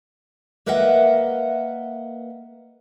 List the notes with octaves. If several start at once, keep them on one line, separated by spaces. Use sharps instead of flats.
A#3 A#4 B4 D#5 E5 F#5